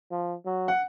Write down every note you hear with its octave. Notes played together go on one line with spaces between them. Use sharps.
F3
F#3
F#5